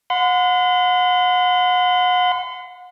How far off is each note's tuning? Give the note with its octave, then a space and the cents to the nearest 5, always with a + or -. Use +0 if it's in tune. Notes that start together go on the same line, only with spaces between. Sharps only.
F#5 -35 C6 -40